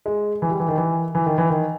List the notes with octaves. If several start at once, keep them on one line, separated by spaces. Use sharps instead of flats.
G#3
E3
G3
E3
D#3
E3
E3
D#3
E3
D#3